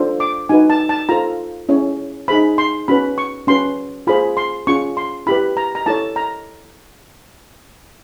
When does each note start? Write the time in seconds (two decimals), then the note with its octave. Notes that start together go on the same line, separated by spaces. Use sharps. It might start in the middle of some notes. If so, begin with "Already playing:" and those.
Already playing: D4 F4 A4 C5
0.20 D6
0.49 D#4 F#4 B4 G#5
0.70 A5
0.89 A5
1.09 F4 A4 C5 A#5
1.69 C#4 E4 G#4 C#5
2.28 D#4 G#4 C5 B5
2.58 C6
2.88 C#4 F#4 B4 B5
3.18 C#6
3.47 C#4 F#4 B4 C6
4.07 F4 G#4 C5 B5
4.37 C6
4.67 C#4 F4 G#4 C#6
4.97 C6
5.27 E4 G4 B4 B5
5.57 A#5
5.75 A#5
5.86 E4 A4 C#5 A5
6.16 A#5